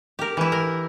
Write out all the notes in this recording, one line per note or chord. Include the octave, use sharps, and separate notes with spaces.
G4 A#4
E3 E4
A#4